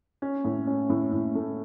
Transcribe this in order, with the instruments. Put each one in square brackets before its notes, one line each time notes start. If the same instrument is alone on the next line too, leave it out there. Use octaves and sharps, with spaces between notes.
[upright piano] C#4
A2
C#4
A2
A2
A3